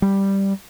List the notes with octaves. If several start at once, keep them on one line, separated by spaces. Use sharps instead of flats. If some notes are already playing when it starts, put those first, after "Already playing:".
G3